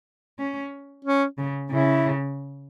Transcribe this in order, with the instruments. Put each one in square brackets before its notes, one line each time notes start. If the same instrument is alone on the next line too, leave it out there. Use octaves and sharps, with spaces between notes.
[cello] C#4
[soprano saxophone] C#4
[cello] C#3
[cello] C#3 [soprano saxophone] E4